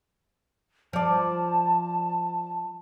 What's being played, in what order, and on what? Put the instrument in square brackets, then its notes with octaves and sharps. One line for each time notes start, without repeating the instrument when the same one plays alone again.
[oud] F3 D5 [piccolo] A5